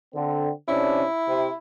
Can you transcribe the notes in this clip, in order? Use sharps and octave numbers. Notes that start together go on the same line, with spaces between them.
D3 C4
C3 C#4 D4 E4
C3